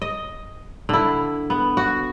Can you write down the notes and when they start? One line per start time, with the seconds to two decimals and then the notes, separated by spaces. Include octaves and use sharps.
0.02 D#5
0.89 D3 E4
1.50 B3
1.77 F#4